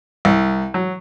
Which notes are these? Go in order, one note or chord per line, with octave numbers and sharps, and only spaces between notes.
C2
F#3